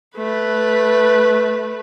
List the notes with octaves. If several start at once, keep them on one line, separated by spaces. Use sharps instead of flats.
A3 B4